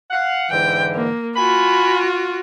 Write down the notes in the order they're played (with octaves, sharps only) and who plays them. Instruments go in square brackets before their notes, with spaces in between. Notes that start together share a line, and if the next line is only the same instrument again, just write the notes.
[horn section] F5 F#5
[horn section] G#2 D3 E3 [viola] G5
[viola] A#3
[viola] F4 F#4 [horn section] G#5 B5